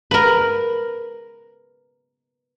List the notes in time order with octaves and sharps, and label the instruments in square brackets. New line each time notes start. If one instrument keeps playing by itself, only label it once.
[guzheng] A#4 B4